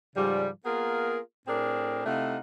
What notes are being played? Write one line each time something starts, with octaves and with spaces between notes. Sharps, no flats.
G#2 C#3 F3 G3
A#3 B3 F4 G#4 A#4
A2 C4 D4 G#4 A#4
C3 A3 D#4 E4 F5 F#5